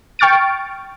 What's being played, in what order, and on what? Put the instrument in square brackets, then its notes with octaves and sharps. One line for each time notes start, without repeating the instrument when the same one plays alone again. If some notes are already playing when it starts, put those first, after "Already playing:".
[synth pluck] G5 C#6 F6 A6 D7